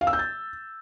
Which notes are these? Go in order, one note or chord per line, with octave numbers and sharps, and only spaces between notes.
F5
E6
G6
A6